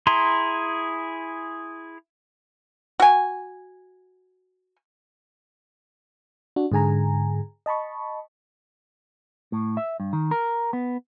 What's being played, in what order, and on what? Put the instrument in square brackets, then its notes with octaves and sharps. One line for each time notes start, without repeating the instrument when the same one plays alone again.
[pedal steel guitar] E4 G#4 A#5 C6
[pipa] F#4 G#5
[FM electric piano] D4 F#4
G#2 D3 G#4 G#5 A#5
D#5 A5 B5 C#6
[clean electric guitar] A2
E5
G2
D#3
A#4
B3